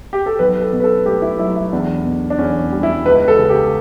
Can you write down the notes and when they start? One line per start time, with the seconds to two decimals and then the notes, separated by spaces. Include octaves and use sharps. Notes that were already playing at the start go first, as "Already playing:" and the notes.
0.13 G4
0.26 A4
0.39 B1 B4
0.62 A4
0.73 B2
0.80 B4
0.84 A4
1.06 A3 G4
1.22 E4
1.39 F#3 E4
1.56 E4
1.72 E2 D4
2.05 B2
2.30 D4
2.39 E2 C#4
2.72 G3
2.83 E4
3.05 C#2 B4
3.28 A4
3.39 C#3
3.49 G4